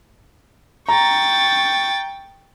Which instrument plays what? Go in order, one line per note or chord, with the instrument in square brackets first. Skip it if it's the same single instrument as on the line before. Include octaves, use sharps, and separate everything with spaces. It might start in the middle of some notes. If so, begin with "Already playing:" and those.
[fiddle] G5 [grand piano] A#5 [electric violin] C#6 A6